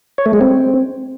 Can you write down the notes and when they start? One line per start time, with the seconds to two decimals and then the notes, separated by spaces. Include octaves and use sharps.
0.18 C#5
0.26 A3
0.33 G#3
0.41 C4